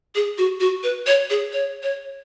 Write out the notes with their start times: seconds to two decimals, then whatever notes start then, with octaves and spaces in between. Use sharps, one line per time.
0.15 G#4
0.38 F#4
0.60 F#4
0.83 B4
1.07 C#5
1.30 G#4
1.53 C#5
1.83 C#5